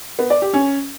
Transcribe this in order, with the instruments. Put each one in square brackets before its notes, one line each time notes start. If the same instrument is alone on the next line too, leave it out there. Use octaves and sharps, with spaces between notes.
[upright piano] B3
D5
G4
C#4